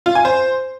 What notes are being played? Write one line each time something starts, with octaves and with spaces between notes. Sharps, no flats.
F4
G#5
C5